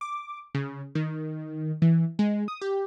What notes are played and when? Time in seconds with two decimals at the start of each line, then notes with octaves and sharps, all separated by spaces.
0.01 D6
0.55 C#3
0.95 D#3
1.82 E3
2.19 G#3
2.48 D#6
2.62 G4